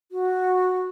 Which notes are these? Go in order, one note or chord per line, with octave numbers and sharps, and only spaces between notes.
F#4